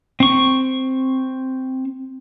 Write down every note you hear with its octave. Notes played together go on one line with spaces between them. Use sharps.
C4 C#6